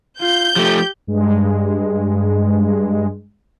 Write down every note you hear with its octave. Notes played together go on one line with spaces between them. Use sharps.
F4 G6
F3 A3 G4
G2 G#3